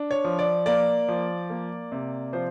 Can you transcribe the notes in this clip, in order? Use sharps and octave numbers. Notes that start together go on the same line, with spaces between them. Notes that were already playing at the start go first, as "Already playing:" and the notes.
Already playing: D4
C#5
F3
D5
A#3 D5
F3
A#3
C3
F3 C5